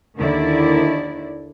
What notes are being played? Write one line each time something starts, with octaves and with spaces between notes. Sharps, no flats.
D#2 D3 D#3 E4 D5